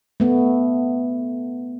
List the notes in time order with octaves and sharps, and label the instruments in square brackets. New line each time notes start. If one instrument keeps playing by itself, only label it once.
[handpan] A3 B3